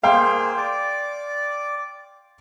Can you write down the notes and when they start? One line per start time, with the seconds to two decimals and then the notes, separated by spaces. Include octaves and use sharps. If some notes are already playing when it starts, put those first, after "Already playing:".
0.03 A#3 G#4 C5 F5 G5 C6
0.57 D5 D6